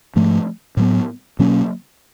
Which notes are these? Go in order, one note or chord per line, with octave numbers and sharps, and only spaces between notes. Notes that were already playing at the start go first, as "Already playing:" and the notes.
G#2 F3 A3
A2 F#3 B3
B2 F#3 A#3 C#4